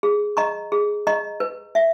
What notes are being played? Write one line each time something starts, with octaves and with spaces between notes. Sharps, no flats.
G#4
D#5 A#5 C#6
G#4
D#5 A#5 C#6
B4
E5